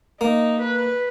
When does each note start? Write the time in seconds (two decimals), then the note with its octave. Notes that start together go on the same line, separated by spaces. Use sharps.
0.21 A#3 D#4
0.60 B4